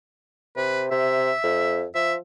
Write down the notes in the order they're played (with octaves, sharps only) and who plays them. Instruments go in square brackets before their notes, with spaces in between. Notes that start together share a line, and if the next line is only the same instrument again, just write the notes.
[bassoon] C3 [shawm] B4
[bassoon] C3 [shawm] E5
[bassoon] F2
[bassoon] F3 [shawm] E5